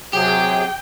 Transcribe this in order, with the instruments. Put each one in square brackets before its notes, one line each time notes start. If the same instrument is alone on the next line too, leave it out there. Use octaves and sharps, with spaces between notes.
[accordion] C3 F#3 G#4 [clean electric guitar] G4 [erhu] G5